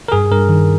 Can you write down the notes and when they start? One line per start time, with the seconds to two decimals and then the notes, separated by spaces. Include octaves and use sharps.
0.08 A#4
0.12 G2 G#4
0.31 G2 A#4
0.49 D#3